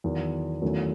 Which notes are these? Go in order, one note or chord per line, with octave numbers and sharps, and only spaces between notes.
E2 D#3 F#3
E2 D#3 F#3 A3 C#4